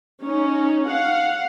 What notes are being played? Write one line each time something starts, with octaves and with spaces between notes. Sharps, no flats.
C#4 D#4
F5 F#5